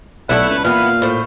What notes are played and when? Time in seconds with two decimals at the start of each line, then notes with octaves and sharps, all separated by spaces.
0.29 B1 A3 A#3 E4 F#5
0.49 C#2 B4
0.64 A#2 E3 B3 F5
1.02 A2 C5